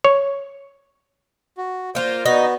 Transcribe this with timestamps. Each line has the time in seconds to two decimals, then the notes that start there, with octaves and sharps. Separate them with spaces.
0.04 C#5
1.58 F#4
1.95 A#3 F4 C5
2.26 B3 D#4 F#4